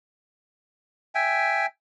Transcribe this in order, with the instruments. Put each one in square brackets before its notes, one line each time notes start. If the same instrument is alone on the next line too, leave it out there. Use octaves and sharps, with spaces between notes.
[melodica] E5 G5 G#5